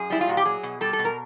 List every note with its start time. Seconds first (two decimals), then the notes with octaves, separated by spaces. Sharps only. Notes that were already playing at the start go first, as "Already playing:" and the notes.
Already playing: F#2 G#4
0.10 G3 E4
0.21 F4
0.28 A#2 F#4
0.37 G4
0.45 F#3 G#4
0.63 B2
0.81 G3 A4
0.93 A4
0.99 B2
1.05 A#4